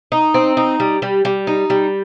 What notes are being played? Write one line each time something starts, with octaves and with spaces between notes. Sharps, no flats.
D#4
C4
D#4
G3
G3
G3
D#4
G3